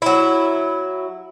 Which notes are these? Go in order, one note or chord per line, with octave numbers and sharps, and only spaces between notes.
F#3 E4